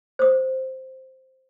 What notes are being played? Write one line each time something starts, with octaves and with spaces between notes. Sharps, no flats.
C5 D#6